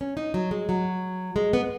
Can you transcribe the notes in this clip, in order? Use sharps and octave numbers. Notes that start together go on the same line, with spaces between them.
C#4
D#4
F#3
G#3
F#3
G#3
B3